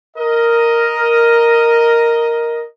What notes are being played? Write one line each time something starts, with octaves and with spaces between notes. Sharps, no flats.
A#4 D#5